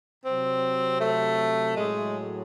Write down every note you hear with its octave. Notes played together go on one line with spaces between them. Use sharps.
C3 F#3 C4
A3
A2 F#3 G#3